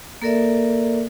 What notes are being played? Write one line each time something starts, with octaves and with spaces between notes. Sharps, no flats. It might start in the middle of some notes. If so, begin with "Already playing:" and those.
A#3 A4 A#4 D5 E5